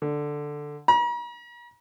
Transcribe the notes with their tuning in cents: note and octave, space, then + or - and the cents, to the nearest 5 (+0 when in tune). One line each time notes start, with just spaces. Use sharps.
D3 +5
A#5 +45